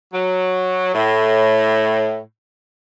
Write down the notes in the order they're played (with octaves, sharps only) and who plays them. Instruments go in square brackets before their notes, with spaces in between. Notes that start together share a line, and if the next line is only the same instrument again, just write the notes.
[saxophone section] F#3
A2